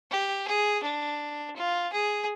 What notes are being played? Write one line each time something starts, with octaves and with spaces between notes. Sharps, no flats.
G4
G#4
D4
F4
G#4